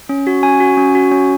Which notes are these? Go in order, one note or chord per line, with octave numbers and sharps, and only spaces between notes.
C#4
F#4
C#4 G#5
F#4
C#4
F#4
C#4